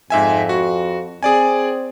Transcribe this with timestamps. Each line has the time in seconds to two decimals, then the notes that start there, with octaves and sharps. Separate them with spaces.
0.10 F2 G#2 E5 G#5
0.49 F#4
1.23 C4 G#4 D5 G#5